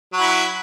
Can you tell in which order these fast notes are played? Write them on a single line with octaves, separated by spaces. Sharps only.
F#3 F#4 E4